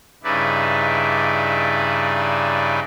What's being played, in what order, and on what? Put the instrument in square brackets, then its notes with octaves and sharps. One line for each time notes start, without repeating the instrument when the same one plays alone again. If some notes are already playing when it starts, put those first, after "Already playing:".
[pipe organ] G2 C#3 D#4 E4 B4 D5